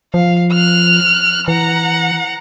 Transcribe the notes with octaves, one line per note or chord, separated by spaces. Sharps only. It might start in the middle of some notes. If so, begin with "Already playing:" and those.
F3 F5
F6 F#6
E3 F#5 A#5